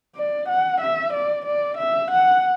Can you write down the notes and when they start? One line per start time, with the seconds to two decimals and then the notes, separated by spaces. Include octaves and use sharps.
0.16 D5
0.49 F#5
0.81 E5
1.13 D5
1.46 D5
1.77 E5
2.11 F#5